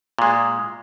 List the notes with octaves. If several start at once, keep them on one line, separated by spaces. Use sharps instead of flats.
A#2 G#3